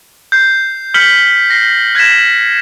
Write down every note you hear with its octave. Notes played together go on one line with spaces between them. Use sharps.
G6 C7
F6 G6 B6 C#7 F#7 G7
A#6 C7
F#6 G#6 A#6 B6 E7
F#7